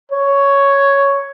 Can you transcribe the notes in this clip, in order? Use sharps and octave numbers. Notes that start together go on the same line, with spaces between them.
C#5